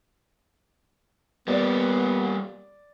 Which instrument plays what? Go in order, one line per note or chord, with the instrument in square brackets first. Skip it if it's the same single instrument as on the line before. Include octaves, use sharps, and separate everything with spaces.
[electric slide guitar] G3 A#3 [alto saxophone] B3 [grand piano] D5